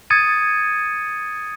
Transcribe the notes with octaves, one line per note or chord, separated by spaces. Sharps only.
D#6 G#6 A6 C#7 D#7